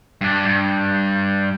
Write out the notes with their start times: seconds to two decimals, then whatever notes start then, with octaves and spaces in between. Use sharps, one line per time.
0.21 G2 D4
0.46 G2